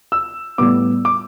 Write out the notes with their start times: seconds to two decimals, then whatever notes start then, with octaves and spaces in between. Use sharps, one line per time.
0.12 E6
0.58 A2 G3 B3 D6
1.05 D6